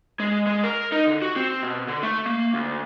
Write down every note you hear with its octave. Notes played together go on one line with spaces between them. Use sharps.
G#3
G#3
A#4
D#4
D3
F#4
C4
B2
D3
A3
A#3
D2